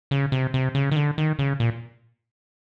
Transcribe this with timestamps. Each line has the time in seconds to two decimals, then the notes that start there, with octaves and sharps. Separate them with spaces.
0.11 C#3
0.32 C3
0.54 C3
0.75 C#3
0.92 D#3
0.96 D3
1.18 D#3
1.39 C#3
1.60 A#2